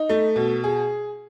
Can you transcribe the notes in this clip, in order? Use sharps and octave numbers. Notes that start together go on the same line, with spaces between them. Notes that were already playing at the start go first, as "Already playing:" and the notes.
Already playing: D#4
A3
B2
G#4